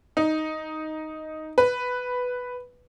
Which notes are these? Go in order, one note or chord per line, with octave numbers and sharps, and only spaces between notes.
D#4
B4